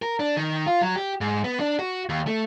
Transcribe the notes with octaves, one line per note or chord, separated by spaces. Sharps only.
A#4
D4
D#3
F4
F#3
G4
G#2
B3
D4
F#4
D#2
A3